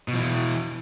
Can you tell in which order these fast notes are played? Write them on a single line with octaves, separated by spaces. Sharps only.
B2 F3 E3